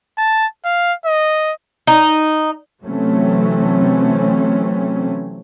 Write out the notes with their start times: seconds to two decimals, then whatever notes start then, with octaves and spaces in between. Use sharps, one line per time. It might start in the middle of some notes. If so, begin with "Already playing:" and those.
0.18 A5
0.65 F5
1.06 D#5
1.87 D#4
2.83 C3 E3 F#3 A3 C4 C#4